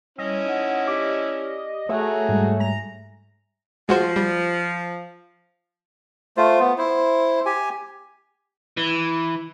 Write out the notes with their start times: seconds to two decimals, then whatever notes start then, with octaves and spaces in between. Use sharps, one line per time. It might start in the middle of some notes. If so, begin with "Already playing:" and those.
0.18 G3 C#4 E4 D#5
0.46 D#4 F#5
0.88 G4 D5 D6 B6
1.89 A3 F#4 G#4 C#5 E5 G#5 A#5
2.29 G#2 G3 G#3
2.60 A#5
3.89 F3 G#3 F#4 C5
4.16 G3
6.37 A3 F4 C5
6.60 B3
6.78 E4 C5
7.46 G4 G#5
8.77 E3